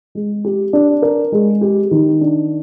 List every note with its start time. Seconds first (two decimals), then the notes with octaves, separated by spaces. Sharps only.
0.15 G#3
0.45 G4
0.73 D4
1.02 A#4
1.32 G#3
1.61 G4
1.91 D#3
2.21 D4